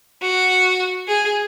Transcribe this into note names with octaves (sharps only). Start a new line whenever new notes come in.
F#4
G#4